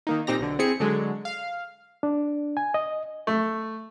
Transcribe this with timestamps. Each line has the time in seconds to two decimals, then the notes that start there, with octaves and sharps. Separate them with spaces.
0.07 D#3 A#3 D#4
0.27 A#2 C4 D#4 G4 A#5 A#6
0.39 B1 D3
0.59 C4 E4 G#4 C#7
0.80 D3 F#3 G#3
1.25 F5
2.03 D4
2.57 G#5
2.74 D#5
3.27 A3